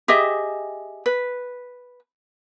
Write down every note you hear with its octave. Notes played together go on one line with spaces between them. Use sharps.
G4 G#4 D#5 E5
B4